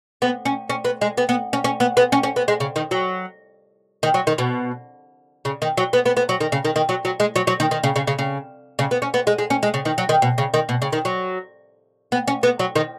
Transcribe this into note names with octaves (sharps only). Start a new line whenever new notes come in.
B3
C#4
C#4
B3
G#3
B3
B3
C#4
C#4
B3
B3
C#4
C#4
B3
G#3
C#3
D#3
F#3
D#3
F#3
D#3
B2
C#3
D#3
F#3
B3
B3
B3
F#3
D#3
C#3
D#3
D#3
F#3
F#3
G#3
F#3
F#3
D#3
D#3
C#3
C#3
C#3
C#3
C#3
B3
C#4
B3
G#3
G#3
C#4
G#3
C#3
D#3
F#3
D#3
B2
C#3
D#3
B2
C#3
D#3
F#3
B3
C#4
B3
F#3
D#3